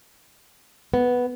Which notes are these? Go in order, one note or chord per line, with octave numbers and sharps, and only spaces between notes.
B3